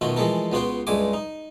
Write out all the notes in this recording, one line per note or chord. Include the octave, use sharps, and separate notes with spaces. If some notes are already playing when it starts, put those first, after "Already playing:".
B2 D#3 A3 F4 F#4
E3 F3 G#3 A3 A4 A#4
C#2 B3 F4 F#4 C5 G5
C#2 G2 G#3 A3 G#5 D6
D#4